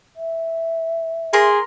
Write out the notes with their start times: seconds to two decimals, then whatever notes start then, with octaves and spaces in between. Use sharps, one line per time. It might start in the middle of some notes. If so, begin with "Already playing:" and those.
0.16 E5
1.33 G#4 A#4 C6